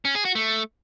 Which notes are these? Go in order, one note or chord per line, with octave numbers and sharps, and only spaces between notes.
C#4
G#4
F#4
A3